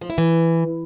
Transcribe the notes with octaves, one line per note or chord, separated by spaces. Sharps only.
F3
E4
E3